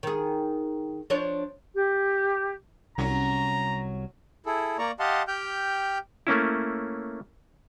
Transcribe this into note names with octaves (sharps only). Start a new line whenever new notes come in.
D#3 G#4
F3 D4 C#5
G4
C2 F#3 C#4 A#5
E4 G#4 A4
A#3 D5 A#5 C#6
G4 D#5 F5 F#5 A5 C6
G4 G5 F6 G6
A3 A#3 C#4 E4